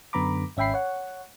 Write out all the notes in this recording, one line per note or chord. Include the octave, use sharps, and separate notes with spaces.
F#2 D3 B3 A#5 B5 D6
G#1 C#4 E5 G5 B5 C7
C#5 F#5